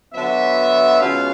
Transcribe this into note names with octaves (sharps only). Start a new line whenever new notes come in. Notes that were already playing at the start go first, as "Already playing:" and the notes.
D3 F#3 B3 E5
B2 G#3 C#4 F4 F5